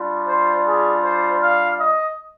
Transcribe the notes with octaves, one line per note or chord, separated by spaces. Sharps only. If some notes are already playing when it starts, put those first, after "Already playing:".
Already playing: G3 D4 F4
C5
G#4
C5
F5
D#5